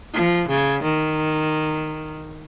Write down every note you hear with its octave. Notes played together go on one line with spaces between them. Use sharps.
F3
C#3
D#3